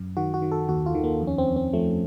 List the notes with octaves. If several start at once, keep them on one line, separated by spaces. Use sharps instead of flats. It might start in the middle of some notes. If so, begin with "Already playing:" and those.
Already playing: F#2
D#3 F#4
F#4
D#3
A4
D#2 F#4
F4
D#3
A#3
F2
C#4
C4
F2
C4
F3 A3